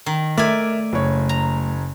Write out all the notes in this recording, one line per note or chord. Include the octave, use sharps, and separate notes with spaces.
D#3
A3 A#4 D5 E5 G#5 D6
F#1 C#5
A#5